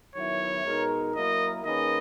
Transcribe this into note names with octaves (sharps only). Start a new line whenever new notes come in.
D#3 F#3 B3 E4 C#5
B2 G#3 D#4 A#4
F#3 A#3 E4 A#4 D#5
D#3 A#3 C#4 G#4 B4 D#5